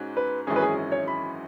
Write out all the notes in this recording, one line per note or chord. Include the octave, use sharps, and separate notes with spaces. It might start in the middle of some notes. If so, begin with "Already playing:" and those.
Already playing: G#2 G#3 C#4 F#4
B4
G#1 F#2 E3 G#3 C#4 G#4
B4
G#4
C#5
B5